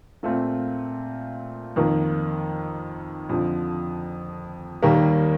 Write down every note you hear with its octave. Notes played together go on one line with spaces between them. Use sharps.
A#2 A3 C4 F4
F2 D#3 A#3
F2 D3 F3
D#2 D#3 G3 A#3